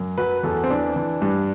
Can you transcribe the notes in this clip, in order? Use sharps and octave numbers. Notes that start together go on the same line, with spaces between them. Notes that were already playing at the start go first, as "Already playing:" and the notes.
Already playing: F#2
F#3 B4
E2 A4
C4
E3 D4
E3
G2